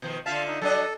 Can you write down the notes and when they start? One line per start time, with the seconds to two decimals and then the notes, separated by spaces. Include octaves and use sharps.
0.02 B2 D#3 F3
0.26 D3 F4 E5 F5 A5
0.47 D#4
0.61 F#3 D4 A4 D#5